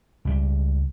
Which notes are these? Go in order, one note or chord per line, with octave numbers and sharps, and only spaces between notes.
C#2 G3